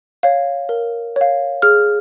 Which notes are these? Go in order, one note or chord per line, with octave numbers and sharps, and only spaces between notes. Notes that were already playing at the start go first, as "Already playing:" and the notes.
C#5 F5
A#4
C#5 F5
G#4 F6